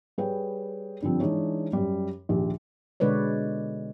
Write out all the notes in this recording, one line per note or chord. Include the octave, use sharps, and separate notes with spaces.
G3 G#4 B4 C#5 G5
G2 D3 F3 C4
E3 G#3 D4 D#4 C#5
F#2 G3
A#1 D#2 G4
B2 D3 G#3 B4 C#5 D5